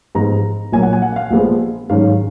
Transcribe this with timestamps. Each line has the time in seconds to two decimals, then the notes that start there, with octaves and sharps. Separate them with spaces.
0.15 G#2 F3 G#3 B3 D#4 A#5
0.72 A#1 A#2 F#3 A#3 G#5
0.82 F#5
0.93 G#5
1.02 F#5
1.13 F#5
1.16 F5
1.31 A#1 A#2 F3 G#3 B3
1.90 G#2 D#3 F#3 C#4 F5